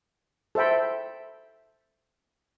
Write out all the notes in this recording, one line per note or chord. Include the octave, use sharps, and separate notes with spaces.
A4 C5 E5 G5 B5